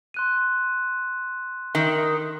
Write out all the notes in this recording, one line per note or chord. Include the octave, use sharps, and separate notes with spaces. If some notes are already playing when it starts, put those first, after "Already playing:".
C6 F#6 D#7
D#3